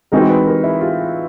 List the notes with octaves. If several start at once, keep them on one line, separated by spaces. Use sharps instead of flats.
E3 G#3 C4 D#4 F#4 A#4
B4
A#4
E4
F4